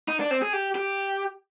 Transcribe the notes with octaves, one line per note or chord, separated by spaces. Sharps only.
D#4
D4
C4
G#4
G4
G4